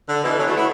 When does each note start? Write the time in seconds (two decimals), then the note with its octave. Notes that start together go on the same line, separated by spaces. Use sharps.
0.09 D3
0.23 B2 E3
0.38 D3 F#3
0.47 E3 A3
0.57 B3 E4